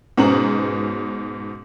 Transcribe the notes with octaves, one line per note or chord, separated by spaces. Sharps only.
G#2 B2 C#4 C5 A#5 F#7